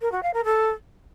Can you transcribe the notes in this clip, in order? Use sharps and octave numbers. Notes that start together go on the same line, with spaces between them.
A#4
F#4
F5
A#4
A4